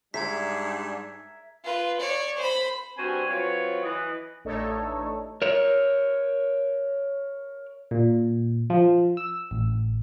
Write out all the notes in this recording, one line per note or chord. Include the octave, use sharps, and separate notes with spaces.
G#2 G3 D4 A#4 E5 G#6 B6
F4 B4
C#5 D5
C5 B5
G2 C4 F#4 C5 G#5
F#3 C4 F4 B4 C#5
E3 B4 D#5
A1 A3 D4 D#4 A4 C#5
A#4 C#5
A#2
F3
E6
A1